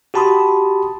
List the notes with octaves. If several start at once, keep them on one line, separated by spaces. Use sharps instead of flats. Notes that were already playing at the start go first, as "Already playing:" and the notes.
F#4 G4 A5 B5 C6 D#6